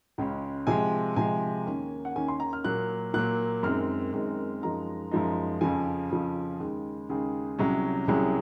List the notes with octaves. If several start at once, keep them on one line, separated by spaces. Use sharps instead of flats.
C#2 C#3 G#3 C#4
C3 F3 G#3 G#5
C3 F3 G#3 G#5
D#2 D#3 A#3 C#4
F#5
D#2 D#3 A#3 C#4 G#5
C6
A#5
F6
A#2 F#3 A#3 F#6
A#2 F#3 A#3 F#6
F#2 D#3 G#3 C4 F6
F#2 D#3 G#3 C4
F#2 F3 G#3 D#4 A#5
F#2 F3 G#3 D#4
F2 C#3 F3 G#5
F2 C#3 F3
D#2 C#3 G#3
D#2 C#3 G#3 G#4
C2 C3 F#3 C#4
C2 C3 F#3 C#4 G#4